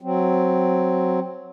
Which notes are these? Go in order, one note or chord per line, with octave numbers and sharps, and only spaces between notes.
F#3 C4